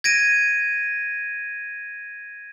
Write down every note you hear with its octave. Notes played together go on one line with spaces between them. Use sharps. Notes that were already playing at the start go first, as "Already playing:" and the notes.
G#6 A#6 D7 D#7